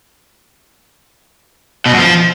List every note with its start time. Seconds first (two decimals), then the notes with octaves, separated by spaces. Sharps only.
1.86 B2
1.92 F#2
1.98 F3